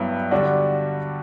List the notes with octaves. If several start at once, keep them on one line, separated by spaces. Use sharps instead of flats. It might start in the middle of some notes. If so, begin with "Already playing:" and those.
Already playing: G2 F#3 B3 E4
D3 G3 D4 F#4